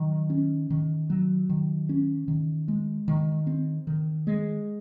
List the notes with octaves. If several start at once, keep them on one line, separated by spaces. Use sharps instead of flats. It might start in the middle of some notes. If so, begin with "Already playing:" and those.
Already playing: D#3 F#3
C#4
D#3
F#3
D#3
C#4
D#3
G#3
D#3
C4
D#3
G#3